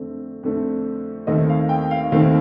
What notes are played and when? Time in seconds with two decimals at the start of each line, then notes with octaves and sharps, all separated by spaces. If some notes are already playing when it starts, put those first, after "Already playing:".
Already playing: F2 D3 A3 C4
0.43 F2 D3 A3 C4
1.27 D#2 D#3 A3 C4 D#5
1.49 F5
1.69 G5
1.91 F5
2.12 D#2 D#3 A3 C4 F5